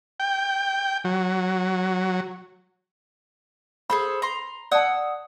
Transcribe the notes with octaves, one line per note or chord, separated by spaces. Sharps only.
G5
F#3
G#4 A4 C5 B5
A#5 C6
D5 F#5 A5 D#6 E6